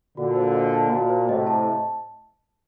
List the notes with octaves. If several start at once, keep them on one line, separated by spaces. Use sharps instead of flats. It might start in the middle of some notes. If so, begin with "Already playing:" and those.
A#2 D3 F#4
C5
D#5
A5
A#2 F#4
C5
A2 C3 D#5
A5